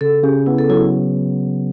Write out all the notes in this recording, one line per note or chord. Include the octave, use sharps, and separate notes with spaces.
C#3 A4
C#3 G4
B3 E4
A4
F#3 E4